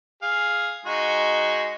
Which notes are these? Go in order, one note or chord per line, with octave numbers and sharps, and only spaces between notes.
G#4 F5
G#3 D#4 F#4